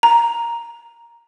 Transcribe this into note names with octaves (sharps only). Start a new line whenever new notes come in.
A#5